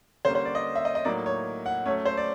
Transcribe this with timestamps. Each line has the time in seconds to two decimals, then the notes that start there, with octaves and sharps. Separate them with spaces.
0.25 D3 G3 A#3 C#4 C5
0.35 C5
0.45 D5
0.55 D#5
0.75 E5
0.85 D#5
0.95 D#5
1.05 A2 F#3 A#3 D#4 D5
1.26 C#5
1.66 F#5
1.85 F#3 A3 C#4 C#5
2.05 C5
2.17 D5